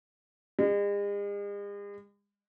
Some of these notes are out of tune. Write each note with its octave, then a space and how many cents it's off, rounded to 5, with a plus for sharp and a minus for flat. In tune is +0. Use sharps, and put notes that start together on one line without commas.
G#3 -45